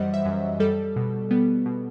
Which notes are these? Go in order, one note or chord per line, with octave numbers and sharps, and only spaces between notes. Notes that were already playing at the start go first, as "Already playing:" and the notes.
Already playing: F#2 E3 G3 C5 D#5 F#5
E5
F#2
G3 A4
B2
G3 B3
B2